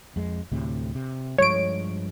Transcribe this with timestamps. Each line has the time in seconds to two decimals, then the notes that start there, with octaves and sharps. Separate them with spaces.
0.16 F2 G#3
0.52 D2 A2 C3
0.95 C3
1.38 G2 F3 G#3 C#5 D7